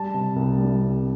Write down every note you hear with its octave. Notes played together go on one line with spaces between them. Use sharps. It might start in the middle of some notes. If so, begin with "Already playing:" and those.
Already playing: G3 A5
C3
C2
G3
C2